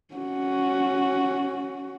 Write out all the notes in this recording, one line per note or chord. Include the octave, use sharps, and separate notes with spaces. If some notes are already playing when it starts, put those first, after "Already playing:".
C#4 F#4